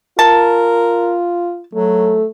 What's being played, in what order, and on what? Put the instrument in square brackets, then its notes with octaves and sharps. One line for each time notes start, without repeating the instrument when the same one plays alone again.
[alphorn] F4 [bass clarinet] A#4 [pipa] A5
[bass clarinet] F#3 [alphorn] A3